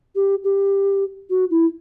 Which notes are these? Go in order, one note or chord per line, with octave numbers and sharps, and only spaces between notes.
G4
G4
F#4
E4